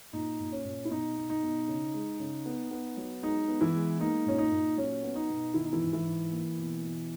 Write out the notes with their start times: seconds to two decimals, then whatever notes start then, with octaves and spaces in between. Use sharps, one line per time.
0.13 A#2 D#4
0.40 A#2
0.52 C#4
0.65 A#2
0.85 E4
0.90 B2 D#4
1.17 B2
1.30 D#4
1.43 B2
1.67 C#3
1.94 G#3
2.19 C#3
2.46 B3
2.71 B3
2.97 F#3
3.22 G#3 D#4
3.48 B3
3.61 E3 E4
3.75 G#3
4.00 A#3 D#4
4.26 A#2 C#4
4.38 D#4
4.51 A#2
4.77 F#3 C#4
5.03 B3
5.15 D#4
5.29 B2
5.54 D#3 E4
5.64 D#4
5.72 E3 E4
5.81 G#2
5.93 E3 E4
6.06 G#2
6.32 A#3
6.58 B2
6.83 B2